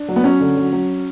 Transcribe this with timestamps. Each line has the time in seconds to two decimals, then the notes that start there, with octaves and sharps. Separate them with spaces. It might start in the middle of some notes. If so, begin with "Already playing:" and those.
Already playing: D4
0.08 F#3
0.16 B3
0.24 F#3 C#4
0.40 D3
0.57 F#3
0.72 F#3